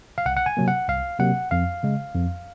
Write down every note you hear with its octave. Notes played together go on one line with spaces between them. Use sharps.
F5
C2 F#5
F#5
G#5
C3 F#3 A#3
F#5
C2 F5
C3 F#3 A#3 F#5
F2 F5
C#3 G#3
F2